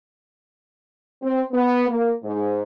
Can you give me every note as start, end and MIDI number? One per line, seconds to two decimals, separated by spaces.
1.22 1.42 60
1.52 1.85 59
1.89 2.12 58
2.23 2.63 44